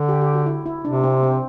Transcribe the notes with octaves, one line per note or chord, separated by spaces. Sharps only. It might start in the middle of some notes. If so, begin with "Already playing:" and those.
Already playing: D3
G4
G4
F#4
E4
E4
C3 D4
C4
C4